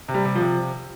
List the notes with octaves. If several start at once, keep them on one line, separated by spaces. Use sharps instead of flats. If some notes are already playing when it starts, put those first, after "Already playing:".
C3
G3
C3
F3
C3